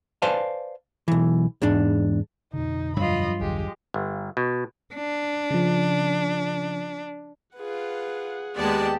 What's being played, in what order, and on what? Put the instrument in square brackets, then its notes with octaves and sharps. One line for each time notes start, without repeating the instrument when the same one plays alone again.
[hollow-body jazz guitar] B4 C5 D5 F5 G#5 A5
B1 E3
E2 G#2 D4
[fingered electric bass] F2 B2 D3 [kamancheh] D#4
[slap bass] G2 F#3 [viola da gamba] F3 F4 [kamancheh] D#5 B5
[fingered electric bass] A#1 E2 D#3 [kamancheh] G#3 [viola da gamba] G4
[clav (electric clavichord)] G1
B2
[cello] D4
[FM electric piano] C#3 F3
[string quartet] F4 B4 [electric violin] G#4 F#5
[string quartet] D#2 A5 [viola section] G#3 B3 D5 [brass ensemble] G4